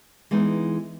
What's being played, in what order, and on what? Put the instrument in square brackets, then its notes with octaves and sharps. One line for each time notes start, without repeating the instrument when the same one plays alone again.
[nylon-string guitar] E3 G#3 B3 D#4